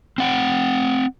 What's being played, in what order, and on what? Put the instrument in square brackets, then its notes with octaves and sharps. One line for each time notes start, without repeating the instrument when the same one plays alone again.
[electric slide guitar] C4 F#5 G5